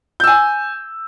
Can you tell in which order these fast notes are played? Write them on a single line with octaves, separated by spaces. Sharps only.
G6 E6 G#5